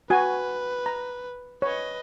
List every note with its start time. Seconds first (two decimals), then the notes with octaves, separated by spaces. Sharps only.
0.10 F#4 B4 G#5
0.86 A#5
1.62 B4 C#5 D#5